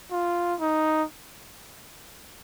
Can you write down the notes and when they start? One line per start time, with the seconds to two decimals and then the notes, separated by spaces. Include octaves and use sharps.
0.11 F4
0.60 D#4